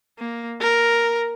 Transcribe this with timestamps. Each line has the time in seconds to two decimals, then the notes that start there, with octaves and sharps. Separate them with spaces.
0.19 A#3
0.61 A#4